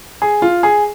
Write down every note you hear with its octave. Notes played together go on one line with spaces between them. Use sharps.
G#4
F4
G#4